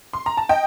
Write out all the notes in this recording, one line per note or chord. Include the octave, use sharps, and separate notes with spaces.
C6
A#5
A5
D#5 G5